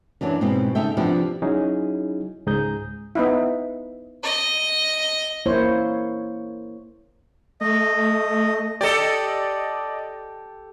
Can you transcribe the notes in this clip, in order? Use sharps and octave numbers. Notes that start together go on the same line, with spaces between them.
F#2 E3 F#3 D4
G#2 B2 C4
C#3 D#4 A4 E5 G5
C3 F3 B3 D4 E4 G4
F#3 C#4 D#4 E4 F#4 G#4
C#2 G#2 G#4 A#5 D#6 G6
B3 D#4 E4
D#5
A#3 E4 C5 C#5
A3 D#5
G4 A4 D5 D#5